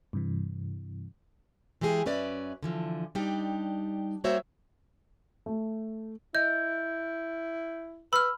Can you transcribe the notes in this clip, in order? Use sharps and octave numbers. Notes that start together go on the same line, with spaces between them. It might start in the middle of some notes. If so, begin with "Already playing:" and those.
G2 C3 E3
E3 G#3 G4 G#4
F#2 C#4 B4 D5 E5
D3 E3 F3
G3 D4 D#4 G4
G3 A#3 F#4 C5 C#5 E5
A3
E4 D#5 G6
B4 B5 E6 F6